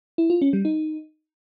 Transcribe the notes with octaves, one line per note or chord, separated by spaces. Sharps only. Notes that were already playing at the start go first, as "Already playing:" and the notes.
E4
F4
C#4
G3
D#4